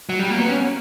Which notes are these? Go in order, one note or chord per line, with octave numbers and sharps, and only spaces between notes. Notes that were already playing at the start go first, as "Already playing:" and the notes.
F#3
G3
A#3
B3
C#4